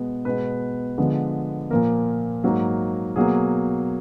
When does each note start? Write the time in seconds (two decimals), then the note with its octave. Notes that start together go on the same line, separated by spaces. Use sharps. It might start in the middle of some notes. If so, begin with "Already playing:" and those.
Already playing: B2 G#3 B3
0.25 B2 G#3 B3 B4
0.98 D3 F3 G#3 B3
1.70 A#2 F3 A#3 A#4
2.44 G#2 F#3 A#3
3.16 B2 F#3 A#3 G#4